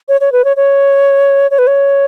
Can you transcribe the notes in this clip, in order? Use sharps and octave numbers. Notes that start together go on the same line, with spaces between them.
C#5
C#5
B4
C#5
C#5
C#5
B4
C#5